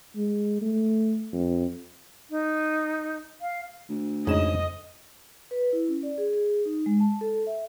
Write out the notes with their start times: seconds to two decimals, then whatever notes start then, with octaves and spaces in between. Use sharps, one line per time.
0.16 G#3
0.62 A3
1.33 F2
2.30 D#4
3.41 F5
3.89 D2
4.27 F2 G#2 C#3 D#5 E7
5.51 B4
5.73 E4
5.88 C#4
6.03 D5
6.18 G#4
6.33 G#4
6.65 D#4
6.86 G#3
7.00 A5
7.21 A4
7.47 E5